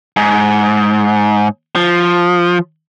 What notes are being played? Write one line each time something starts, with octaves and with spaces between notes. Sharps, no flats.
G#2
F3